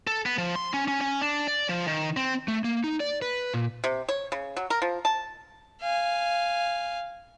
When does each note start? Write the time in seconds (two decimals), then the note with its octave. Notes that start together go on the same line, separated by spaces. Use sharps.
0.07 A4
0.26 B3
0.38 F3
0.56 C6
0.74 C#4
0.88 C#4
1.01 C#4
1.21 D4
1.47 D5
1.69 F3
1.87 D#3
2.17 C4
2.48 A3
2.64 A#3
2.84 D#4
3.00 D5
3.22 B4
3.54 A#2
3.84 C3
4.09 C#5
4.32 C#3
4.57 F#3
4.70 A#4
4.82 F3
5.05 A5
5.81 F5 G#5